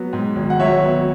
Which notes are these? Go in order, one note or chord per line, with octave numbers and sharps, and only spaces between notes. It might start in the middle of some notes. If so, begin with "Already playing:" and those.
Already playing: F#3 B3
G#2
G#1
F#5
F#3 C#5 E5
B3